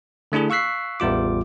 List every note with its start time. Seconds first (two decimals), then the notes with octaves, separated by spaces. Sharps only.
0.32 D3 A3 D4 E4 G#4
0.50 F5 C#6 E6 F#6 B6 C7
1.00 A1 E2 G3 F4 D6